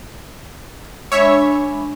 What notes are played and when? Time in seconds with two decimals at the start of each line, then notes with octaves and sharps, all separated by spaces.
1.12 G#3 D4 C#5 E5 B5